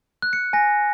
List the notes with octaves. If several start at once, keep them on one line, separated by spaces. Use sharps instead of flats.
F#6
C#7
G#5 A#6